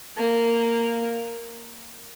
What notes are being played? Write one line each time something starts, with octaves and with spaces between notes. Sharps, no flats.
A#3